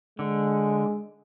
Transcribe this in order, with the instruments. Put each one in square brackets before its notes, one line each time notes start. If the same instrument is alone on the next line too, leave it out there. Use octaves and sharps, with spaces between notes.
[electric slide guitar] D3 [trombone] G#3